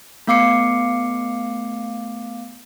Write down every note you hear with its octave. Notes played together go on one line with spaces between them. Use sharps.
A3 B3 F5 D6 C7 C#7